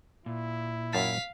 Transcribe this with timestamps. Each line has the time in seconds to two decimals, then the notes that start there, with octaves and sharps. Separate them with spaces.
0.26 A#2 E4
0.93 F#2 F5 A5 B6